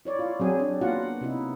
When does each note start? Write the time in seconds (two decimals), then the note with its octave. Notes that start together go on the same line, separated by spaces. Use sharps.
0.05 E4 C#5 D5
0.19 F4
0.40 F#3 C4 G#4
0.60 D4
0.81 A#3 B3 F4 F#4 F#5
1.21 C3 D#4 E4